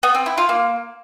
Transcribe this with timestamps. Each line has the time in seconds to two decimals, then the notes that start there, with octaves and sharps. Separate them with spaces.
0.03 B3
0.15 C4
0.26 E4
0.37 F4
0.49 A#3